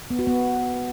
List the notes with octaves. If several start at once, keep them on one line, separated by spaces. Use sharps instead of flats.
B3
F#4
B3